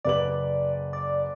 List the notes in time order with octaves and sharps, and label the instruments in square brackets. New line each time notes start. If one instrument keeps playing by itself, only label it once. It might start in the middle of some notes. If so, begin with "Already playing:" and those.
[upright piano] F#1 B4 F#7 [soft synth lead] D5
[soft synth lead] D5